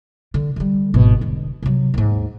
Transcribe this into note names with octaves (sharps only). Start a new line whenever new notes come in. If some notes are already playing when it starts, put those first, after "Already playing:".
D3
D3 G3
G#1 B2
E1 D3
C3 F#3
D#2 G#2